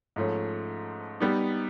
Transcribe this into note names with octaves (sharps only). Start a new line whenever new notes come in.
G#2 F3 A3 C#4
G3 B3 D#4